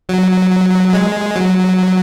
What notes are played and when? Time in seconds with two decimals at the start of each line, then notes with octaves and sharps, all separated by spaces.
0.09 F#3
0.93 G#3
1.36 F#3